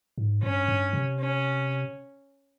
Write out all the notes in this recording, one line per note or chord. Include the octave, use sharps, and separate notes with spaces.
G#2
G2 C#4
G2
C3
C#4